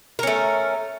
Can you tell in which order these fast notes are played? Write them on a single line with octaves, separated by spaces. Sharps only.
A#4 C#4 A3